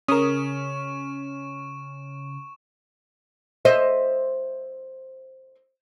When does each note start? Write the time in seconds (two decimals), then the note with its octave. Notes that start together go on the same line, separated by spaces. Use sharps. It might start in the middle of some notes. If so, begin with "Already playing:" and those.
0.08 C#3 C#4 A#4 C#6 D#6 E7
3.65 C5 D#5 E5